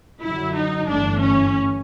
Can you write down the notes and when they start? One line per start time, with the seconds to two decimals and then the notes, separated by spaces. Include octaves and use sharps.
0.21 F#2 D3 F#3 E4
0.54 D#4
0.88 G1 G2 E3 A3 D4
1.20 C#4